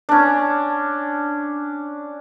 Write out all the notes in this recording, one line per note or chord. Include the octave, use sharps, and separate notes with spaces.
C#4 D4